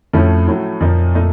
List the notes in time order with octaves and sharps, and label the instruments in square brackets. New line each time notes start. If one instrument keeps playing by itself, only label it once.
[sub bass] F2 [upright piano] A2 F3 A3 C#4
[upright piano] A2 F#3 A3
[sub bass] F2 [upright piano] A#2 F3 A#3 D#4
[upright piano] A#2 A3 D#4